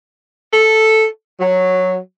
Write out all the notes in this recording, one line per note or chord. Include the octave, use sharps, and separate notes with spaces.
A4
F#3